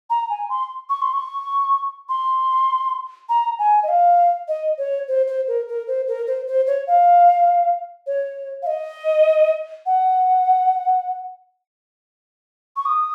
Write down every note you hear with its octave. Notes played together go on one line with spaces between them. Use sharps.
A#5
G#5
C6
C#6
C6
C#6
C6
A#5
G#5
D#5
F5
D#5
C#5
C5
C5
A#4
A#4
C5
A#4
C5
C5
C#5
F5
C#5
F5
D#5
F#5
C#6
D#6